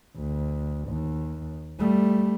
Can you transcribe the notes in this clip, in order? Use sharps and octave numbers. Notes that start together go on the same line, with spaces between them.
D2
D#2
G3 A3